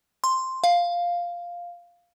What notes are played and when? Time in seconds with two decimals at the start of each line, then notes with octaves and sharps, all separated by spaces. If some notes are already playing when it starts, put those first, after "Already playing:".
0.24 C6
0.64 F5